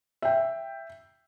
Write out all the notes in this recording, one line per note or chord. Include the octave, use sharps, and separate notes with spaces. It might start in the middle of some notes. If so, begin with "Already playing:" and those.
E5 G5